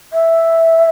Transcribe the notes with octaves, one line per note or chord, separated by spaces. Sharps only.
E5